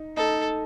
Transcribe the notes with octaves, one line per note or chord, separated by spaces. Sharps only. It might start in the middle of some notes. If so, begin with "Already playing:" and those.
Already playing: D#4
D#4 A4